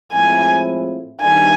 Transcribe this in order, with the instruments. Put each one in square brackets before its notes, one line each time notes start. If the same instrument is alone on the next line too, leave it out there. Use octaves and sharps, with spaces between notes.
[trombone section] A2 F3 G#3 C4 E4 [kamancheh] G#5
[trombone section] D#3 G3 B3 D4 [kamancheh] G#5